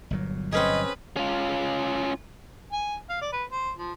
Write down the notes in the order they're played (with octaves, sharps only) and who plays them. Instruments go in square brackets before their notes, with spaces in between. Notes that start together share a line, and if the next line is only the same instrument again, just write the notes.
[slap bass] G1 A#2 F#3
[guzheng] C4 C#4 G#4 [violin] B4 [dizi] D#5
[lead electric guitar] C#4 F4
[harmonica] G#5
F5
D5
B4
C5
F3